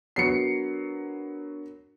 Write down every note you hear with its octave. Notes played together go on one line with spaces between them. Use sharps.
F#3 B3 D4 A#4 C#5 C7 C#7